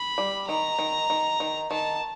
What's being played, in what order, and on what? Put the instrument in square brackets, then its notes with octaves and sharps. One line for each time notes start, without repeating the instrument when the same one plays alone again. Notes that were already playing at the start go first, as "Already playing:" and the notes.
Already playing: [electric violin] B5
[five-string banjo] G3
[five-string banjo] D#3 [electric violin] A#5
[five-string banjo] D#3
D#3
D#3
[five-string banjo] D#3 [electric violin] A5